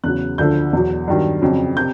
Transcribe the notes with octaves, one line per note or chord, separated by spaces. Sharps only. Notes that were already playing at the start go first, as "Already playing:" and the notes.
E2 C#3 F#3 F#6
D2 D3 F3 G6
E2 B2 F#3
G2 D#3 F#3
F2 C#3 F#3
C3 G6